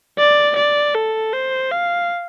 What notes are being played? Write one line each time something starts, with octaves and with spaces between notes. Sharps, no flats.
D5
D5
A4
C5
F5